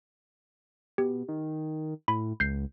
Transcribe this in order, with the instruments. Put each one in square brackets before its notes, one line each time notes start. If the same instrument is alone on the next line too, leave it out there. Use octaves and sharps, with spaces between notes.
[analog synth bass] B2 [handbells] G4
[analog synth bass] D#3
[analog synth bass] A2 [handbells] B5
[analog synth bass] C#2 [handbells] G6 C7